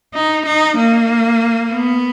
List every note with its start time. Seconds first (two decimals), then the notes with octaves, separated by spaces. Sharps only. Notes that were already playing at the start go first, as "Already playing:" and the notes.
0.14 D#4
0.46 D#4
0.77 A#3
1.71 B3